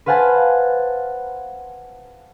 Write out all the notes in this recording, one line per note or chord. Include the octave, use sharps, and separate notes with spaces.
B4 C5 F5 F#5 G#5 A5